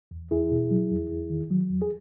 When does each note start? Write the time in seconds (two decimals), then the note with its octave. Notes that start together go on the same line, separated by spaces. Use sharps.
0.11 E2
0.31 E2 E4 G#4
0.51 B2
0.71 F#3
0.91 E2
1.10 E2
1.30 D#3
1.50 F#3
1.70 E2
1.82 G#4